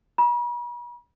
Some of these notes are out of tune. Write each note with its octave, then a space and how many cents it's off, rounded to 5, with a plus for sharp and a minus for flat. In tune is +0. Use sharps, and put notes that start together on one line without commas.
B5 -45